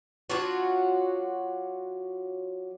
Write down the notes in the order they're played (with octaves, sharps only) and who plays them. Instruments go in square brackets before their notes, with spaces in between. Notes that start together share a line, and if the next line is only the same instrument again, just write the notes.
[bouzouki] F#3 D4 F4 F#4